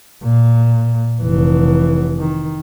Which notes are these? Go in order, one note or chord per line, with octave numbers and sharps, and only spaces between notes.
A#2
F1 E3
D#3